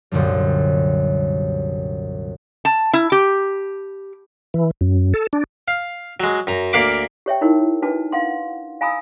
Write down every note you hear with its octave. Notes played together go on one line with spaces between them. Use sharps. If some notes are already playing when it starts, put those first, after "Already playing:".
C2 F#2 A#2 D3 G3
A5
E4
G4
E3
F#2
A4
D4
F5
F#3 G#3
F#2 A#5
D2 A#3 A#4 F5 B5 D6
G4 C#5 E5 G5
D#4 E4 F#4 A#4 C#5
D4 F#4 B4 A5
F5 F#5 C6
F5 G#5 A#5 B5 D#6 E6